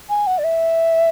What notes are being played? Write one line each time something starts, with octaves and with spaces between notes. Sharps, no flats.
G#5
F#5
D5
E5